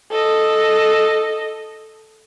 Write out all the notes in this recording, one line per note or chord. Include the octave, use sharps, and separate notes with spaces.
A4 D#5